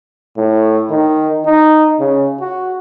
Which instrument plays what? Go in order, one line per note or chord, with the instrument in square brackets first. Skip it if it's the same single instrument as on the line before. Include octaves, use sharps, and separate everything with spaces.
[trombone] A2
D#3
D#4
C#3
F#4